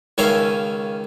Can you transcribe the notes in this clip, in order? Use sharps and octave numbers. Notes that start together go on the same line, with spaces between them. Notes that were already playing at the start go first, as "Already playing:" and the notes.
C#2 D#3 C#4 E5 F5 G#5